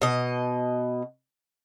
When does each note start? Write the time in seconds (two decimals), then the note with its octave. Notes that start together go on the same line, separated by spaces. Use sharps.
0.02 B2 D#5